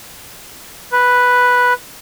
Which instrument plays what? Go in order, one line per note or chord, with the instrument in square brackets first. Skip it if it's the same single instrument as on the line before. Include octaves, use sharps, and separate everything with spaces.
[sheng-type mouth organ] B4